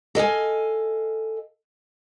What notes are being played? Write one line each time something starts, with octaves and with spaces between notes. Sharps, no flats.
A4 D#5 F5 G#5